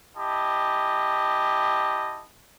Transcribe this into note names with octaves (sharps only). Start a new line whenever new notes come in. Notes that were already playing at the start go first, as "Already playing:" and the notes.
E4 G4 D#5 A5